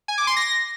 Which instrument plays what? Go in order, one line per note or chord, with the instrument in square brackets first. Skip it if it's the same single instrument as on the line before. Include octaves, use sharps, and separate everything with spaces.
[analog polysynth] G#5
D6
C6
A#6